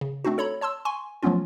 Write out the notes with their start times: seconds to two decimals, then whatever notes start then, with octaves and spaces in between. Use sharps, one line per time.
0.01 C#3
0.25 A3 C4 D4 D#4 F#4
0.38 A4 C#5 A#5 B5
0.61 C#5 A5 C6 E6
0.85 G#5 C6 C#6
1.23 F3 F#3 A3 B3 C#4 F4